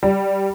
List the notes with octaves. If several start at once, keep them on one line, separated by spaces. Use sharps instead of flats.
G3